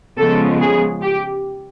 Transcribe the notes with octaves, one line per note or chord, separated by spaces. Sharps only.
C#3 F3 G#3 B3 A4
G#4
G4